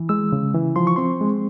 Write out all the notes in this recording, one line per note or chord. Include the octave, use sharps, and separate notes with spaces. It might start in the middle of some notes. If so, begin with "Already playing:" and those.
Already playing: E3
G#3 E6
C#3
E3
F3 C6
C#6
C4 C6
G#3